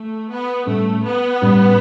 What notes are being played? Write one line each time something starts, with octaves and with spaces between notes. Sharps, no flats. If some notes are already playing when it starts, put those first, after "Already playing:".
Already playing: A3
B3
A2 G3 A3 C#4
B3
A2 G3 C#4